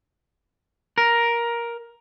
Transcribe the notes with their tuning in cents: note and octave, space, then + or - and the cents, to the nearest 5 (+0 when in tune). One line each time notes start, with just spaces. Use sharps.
A#4 +10